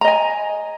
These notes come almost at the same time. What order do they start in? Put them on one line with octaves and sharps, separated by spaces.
A#5 D#5 G#5